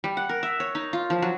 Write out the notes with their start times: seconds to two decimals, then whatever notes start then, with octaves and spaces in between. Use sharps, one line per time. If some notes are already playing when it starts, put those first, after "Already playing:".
0.04 G3
0.17 F#5
0.29 A#4
0.43 E5
0.60 C#5
0.75 D#4
0.93 F4
1.10 F3
1.22 F#3